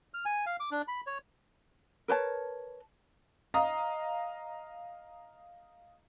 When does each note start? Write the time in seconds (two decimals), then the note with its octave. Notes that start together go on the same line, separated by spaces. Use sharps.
0.14 F6
0.25 G#5
0.46 F5
0.60 D6
0.71 D4
0.88 B5
1.07 C#5
2.08 A#4 B4 C#5 A5
3.54 D#5 F5 A#5 D#6